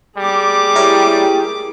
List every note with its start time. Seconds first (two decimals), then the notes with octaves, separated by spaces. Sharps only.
0.18 G3 G#4 D6
0.75 E4 G4 A#4 C#5